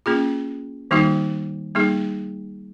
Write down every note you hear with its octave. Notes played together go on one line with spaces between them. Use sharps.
A#3 C#4 F4 G#4
D#3 G3 A#3 D#4 F#4
G3 A#3 D#4 G#4